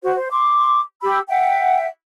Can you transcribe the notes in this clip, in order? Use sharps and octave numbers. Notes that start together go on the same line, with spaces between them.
F#4 C5
C5
C6 D6
G4 B5 E6
E5 F#5 G5